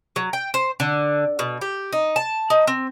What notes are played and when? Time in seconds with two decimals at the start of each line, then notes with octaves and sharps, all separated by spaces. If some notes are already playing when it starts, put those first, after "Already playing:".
0.16 F#3
0.33 G5
0.54 C5
0.80 D3
1.39 B2
1.61 G4
1.93 D#4
2.16 A5
2.50 D#4
2.67 C4